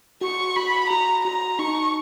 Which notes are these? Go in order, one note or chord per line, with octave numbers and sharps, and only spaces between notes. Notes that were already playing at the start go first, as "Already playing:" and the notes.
F#4 C#6
F#4 B5
F#4 A#5
F#4 A#5
D#4 C#6